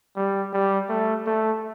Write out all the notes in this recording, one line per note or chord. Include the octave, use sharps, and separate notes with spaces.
G3
G3
A3
A3